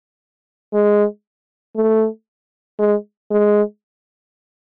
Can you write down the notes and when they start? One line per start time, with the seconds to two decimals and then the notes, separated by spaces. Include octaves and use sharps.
0.73 G#3
1.76 A3
2.79 G#3
3.31 G#3